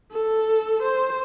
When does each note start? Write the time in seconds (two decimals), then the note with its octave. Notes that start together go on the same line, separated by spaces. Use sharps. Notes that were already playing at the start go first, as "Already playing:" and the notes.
0.11 A4
0.82 C5